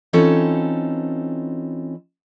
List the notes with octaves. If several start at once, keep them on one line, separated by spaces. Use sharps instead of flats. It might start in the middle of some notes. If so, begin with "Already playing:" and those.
E3 C4 C#4 D#4 F4 A4